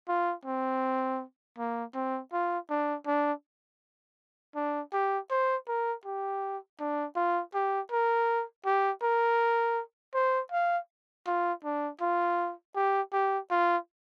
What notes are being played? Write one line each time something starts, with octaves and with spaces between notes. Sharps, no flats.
F4
C4
A#3
C4
F4
D4
D4
D4
G4
C5
A#4
G4
D4
F4
G4
A#4
G4
A#4
C5
F5
F4
D4
F4
G4
G4
F4